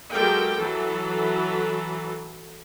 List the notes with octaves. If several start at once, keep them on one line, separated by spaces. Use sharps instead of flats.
F#3 G#3 G4 A4 A#4 G5
E3 F#3 A4